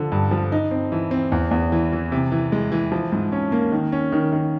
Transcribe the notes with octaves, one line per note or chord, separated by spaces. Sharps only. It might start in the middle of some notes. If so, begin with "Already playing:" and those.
Already playing: D3 F3
G2
F3
D#4
C4
E3
C4
E2
E2
E3
E3
C3
E3
G#3
E3
F3
G#2
C#4
A#3
D#3
C#4
D#3
D#3